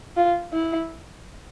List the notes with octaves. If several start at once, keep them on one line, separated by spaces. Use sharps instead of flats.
F4
E4